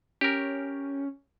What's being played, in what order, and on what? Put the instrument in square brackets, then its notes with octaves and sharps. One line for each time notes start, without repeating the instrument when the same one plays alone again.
[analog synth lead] C#4 [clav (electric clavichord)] G4 A#4